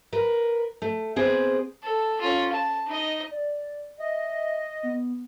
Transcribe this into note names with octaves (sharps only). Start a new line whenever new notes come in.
A#4 B4
A3
B3 C4 G#4 B4 C5 D5
A4
C#4 F4
A5
D#4 D#5
D5
D#5 E5
B3